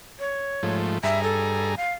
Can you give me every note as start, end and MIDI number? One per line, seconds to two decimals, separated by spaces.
0.20 0.75 73
0.63 0.98 44
0.63 0.98 53
0.63 0.98 57
1.03 1.75 43
1.03 1.75 68
1.03 1.23 76
1.03 1.75 82
1.23 1.75 69
1.77 1.92 77